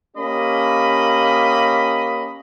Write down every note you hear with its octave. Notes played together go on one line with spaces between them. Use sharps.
A#3 C#4 G4 D#5 B5